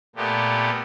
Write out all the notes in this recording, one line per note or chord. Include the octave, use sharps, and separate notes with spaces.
A#2 A3 B3 G4